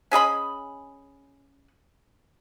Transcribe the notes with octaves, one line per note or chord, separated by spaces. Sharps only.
C#4 G#4 D#5 B5